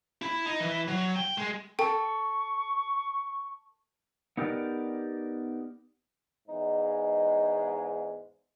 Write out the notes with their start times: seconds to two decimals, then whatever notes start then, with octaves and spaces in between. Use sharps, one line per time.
0.22 E4 B5
0.46 D#4
0.60 E3 E4
0.88 F#3
1.16 G5
1.38 G#3
1.79 A4 G5 C#6
4.37 B3 D#4 G4 A#4 D5
6.48 E2 G#2 G#3 D#4